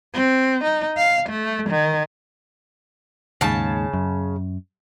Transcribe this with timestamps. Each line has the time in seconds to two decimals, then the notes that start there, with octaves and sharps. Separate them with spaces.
0.14 C4
0.64 D#4
0.97 F5
1.30 A3
1.70 D#3
3.41 D#2 G#2 C#3 A5
3.93 F#2